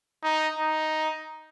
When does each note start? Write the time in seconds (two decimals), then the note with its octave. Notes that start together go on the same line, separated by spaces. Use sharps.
0.23 D#4
0.59 D#4